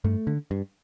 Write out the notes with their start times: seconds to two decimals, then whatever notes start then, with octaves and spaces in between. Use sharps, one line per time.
0.04 G2 A3
0.27 D3
0.51 G2